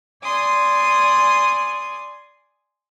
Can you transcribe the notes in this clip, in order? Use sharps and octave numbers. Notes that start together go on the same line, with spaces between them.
D5 G#5 C6 D#6